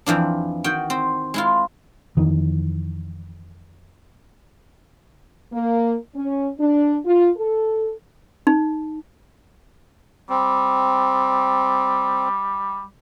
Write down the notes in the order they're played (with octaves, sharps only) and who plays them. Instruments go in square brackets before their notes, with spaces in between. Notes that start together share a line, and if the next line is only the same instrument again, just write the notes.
[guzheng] F2 E3 F3 D4
D#3 F#4 G5
C4
G#3 E4 F4
[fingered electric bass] F2 D#3 E3
[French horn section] A#3
C#4
D4
F4
A4
[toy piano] D#4
[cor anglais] G3 [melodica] C4